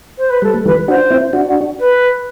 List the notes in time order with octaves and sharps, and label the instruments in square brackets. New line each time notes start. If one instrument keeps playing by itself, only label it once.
[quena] C5
B4
[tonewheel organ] G3 [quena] A4
[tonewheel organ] A3
[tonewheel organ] E3 G3 [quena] B4
[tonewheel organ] D4 F#4 [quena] C5
[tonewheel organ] C4 E4
D4 F#4
[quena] B4